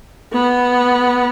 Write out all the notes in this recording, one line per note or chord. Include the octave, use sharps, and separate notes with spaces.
B3